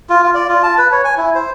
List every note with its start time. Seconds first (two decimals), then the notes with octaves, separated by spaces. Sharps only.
0.09 F4
0.23 F4
0.34 D5
0.49 F4
0.63 A5
0.78 B4
0.92 C#5
1.05 G#5
1.17 E4
1.35 C5